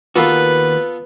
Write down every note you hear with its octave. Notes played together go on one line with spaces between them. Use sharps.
D#2 A#3 B3 F4 F#4 A4 B4